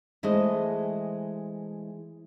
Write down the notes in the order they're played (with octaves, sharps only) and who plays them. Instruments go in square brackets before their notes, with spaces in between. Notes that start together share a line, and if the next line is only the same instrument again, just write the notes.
[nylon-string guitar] E3 G#3 A3 C5 D#5